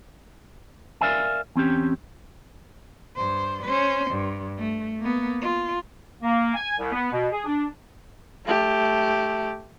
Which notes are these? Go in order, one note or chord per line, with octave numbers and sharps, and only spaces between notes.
A#4 D5 E5 F5 G#5
E2 C4 C#4 G4
G2 C5
C#4 C5
G2
A3
A#3 B3
F4
A#3
G#5
C2
B3
B2
G#4
D4
A3 G4